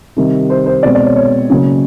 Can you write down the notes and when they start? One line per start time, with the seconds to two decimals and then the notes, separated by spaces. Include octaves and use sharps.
0.16 C3 D#3 G3
0.50 C5
0.66 C5
0.83 B2 G#3 C4 D5
0.95 D5
1.05 C#5
1.16 C#5
1.50 C#3 F#3 A#3